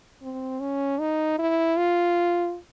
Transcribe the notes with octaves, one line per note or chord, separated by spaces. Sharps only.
C4
C#4
D#4
E4
F4